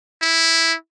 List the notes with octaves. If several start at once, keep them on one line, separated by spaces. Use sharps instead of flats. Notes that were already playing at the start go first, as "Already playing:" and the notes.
E4